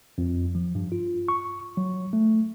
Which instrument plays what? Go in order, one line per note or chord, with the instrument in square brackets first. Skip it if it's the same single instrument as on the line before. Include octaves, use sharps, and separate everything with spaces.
[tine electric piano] F2
F3
G2
F4
C#6
F#3
A3